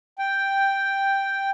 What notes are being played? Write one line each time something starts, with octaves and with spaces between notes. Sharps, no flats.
G5